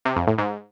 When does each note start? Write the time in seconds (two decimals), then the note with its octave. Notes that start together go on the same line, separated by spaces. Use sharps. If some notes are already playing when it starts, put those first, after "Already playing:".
0.05 C3
0.16 F2
0.27 A2
0.38 G#2